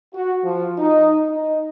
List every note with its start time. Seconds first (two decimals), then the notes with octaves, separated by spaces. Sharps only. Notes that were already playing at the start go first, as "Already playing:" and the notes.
0.15 F#4
0.44 F3
0.79 D#4
1.29 D#4